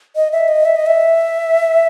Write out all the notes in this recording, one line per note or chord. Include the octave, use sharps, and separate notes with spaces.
D#5
E5
D#5
E5
D#5
E5